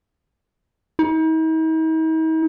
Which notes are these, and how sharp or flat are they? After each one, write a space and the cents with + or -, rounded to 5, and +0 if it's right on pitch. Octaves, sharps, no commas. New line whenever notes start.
D#4 +45